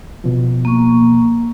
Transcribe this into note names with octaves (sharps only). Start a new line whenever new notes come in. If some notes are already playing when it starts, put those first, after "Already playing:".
B2 F3
A#3 C#6